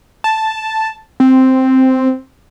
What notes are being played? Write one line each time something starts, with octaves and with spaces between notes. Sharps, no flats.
A5
C4